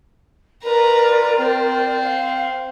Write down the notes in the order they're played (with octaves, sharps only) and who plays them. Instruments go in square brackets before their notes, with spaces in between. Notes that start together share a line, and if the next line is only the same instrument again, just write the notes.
[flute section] F4 A#4 D5 [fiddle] B4 A#5
[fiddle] C4
[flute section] F5